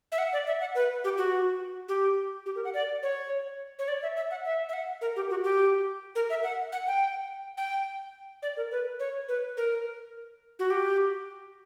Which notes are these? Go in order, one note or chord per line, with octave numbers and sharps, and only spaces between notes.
E5
F#5
D5
E5
F#5
B4
G4
F#4
G4
G4
A#4
F#5
D5
C#5
C#5
D5
E5
E5
F#5
E5
E5
F#5
A#4
G4
F#4
G4
A#4
E5
F#5
F#5
G5
G5
D5
A#4
B4
C#5
B4
A#4
F#4
G4